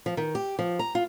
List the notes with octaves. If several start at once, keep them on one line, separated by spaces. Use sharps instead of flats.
F3
D#3
G4
F3
A#5
F4